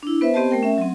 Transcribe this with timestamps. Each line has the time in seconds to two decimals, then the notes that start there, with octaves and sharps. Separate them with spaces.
0.03 D4 E4
0.21 B3 B4 C5 E5
0.34 B3 C4 G4 C5 D#5 A5
0.51 A3 A#4 G5
0.63 C#4 E5
0.78 F#3 C4